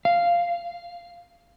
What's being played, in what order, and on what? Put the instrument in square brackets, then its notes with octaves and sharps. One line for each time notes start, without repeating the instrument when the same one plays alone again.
[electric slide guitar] F5